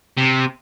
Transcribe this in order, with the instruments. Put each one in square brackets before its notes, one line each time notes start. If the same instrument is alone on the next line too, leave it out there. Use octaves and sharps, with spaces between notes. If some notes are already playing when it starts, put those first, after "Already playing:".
[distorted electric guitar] C3